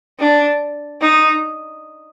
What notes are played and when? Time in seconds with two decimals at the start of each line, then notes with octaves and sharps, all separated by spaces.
0.20 D4
1.01 D#4